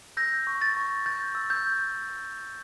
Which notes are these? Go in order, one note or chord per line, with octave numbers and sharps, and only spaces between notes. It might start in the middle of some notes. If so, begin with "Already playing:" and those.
E6 G6 A#6
C#6
A6
C#6
G6 A6
E6
G6